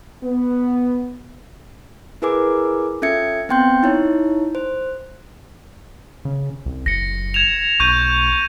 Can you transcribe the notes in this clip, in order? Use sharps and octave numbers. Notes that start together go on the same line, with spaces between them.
B3
E4 G#4 A#4 B4 G#5 D6
C#4 F4 A4 E5 G#6 C#7
B3 C4 G5 C6 G6
D#4 E4 C#5
C5
C#3
C2
F#1 A#6 C#7
G#6 E7 F7
B1 C#6 G6 D#7